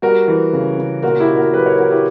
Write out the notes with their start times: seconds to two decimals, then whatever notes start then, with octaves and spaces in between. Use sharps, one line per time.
0.02 G3 F#4 A#4
0.28 E3
0.53 C#3
0.78 C#3
1.03 A#2 F#4 A#4
1.20 E4 G4
1.28 A#2
1.36 F#4 A#4
1.54 F#3 G4 B4
1.66 A#4 C#5
1.78 F#3 F#4 A#4
1.91 E4 G4